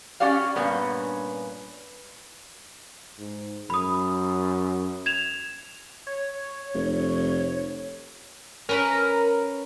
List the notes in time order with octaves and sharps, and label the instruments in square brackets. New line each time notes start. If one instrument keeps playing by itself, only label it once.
[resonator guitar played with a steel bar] C#4 F#4 G4 D5 F5
G2 A#2 B3 C#4
[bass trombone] G#2
[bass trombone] F#2 [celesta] B5 D#6
[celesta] G#6 E7 F7
[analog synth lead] C#5
[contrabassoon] F1
[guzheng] C#4 B4 B5 [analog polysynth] A#4